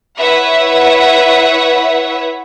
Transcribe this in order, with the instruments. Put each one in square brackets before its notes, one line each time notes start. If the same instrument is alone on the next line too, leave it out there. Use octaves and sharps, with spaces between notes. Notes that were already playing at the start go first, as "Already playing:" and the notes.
[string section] E4 B4 C#5 E5 F#5